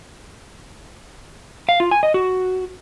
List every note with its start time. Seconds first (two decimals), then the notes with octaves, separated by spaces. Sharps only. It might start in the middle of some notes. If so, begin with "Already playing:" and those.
1.69 F5
1.80 F4
1.91 G#5
2.03 D#5
2.14 F#4